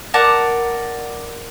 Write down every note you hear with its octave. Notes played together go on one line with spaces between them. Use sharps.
A#4 D5 F#5 A5